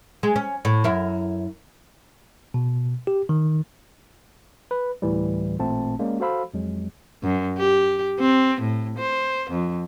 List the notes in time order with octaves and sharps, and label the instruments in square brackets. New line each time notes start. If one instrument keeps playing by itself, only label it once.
[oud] G#3
C#4
A2
F#2 E4 A#4
[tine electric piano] B2
G4
D#3
B4
D2 A2 E3 G3
A1 A#2 A3 C4 A5
G#3 A#3 C#4 D5
F#4 A4 C5 F5 B5 E6
F2 F#3 G#3
[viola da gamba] F#2
G4
C4
A2
C5
F2